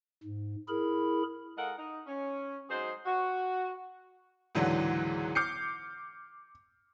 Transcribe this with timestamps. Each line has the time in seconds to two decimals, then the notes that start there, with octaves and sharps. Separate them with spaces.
0.23 G#2
0.69 E4 G#4 A#4 B5
1.57 G#3 A4 A#4 D#5 F5 F#5
1.78 D#4
2.07 C#4
2.70 F#3 G#3 D#4 G#4 C5
3.06 F#4
4.55 C#2 G#2 D3 E3 F#3
5.35 D6 F6 G6 C7 C#7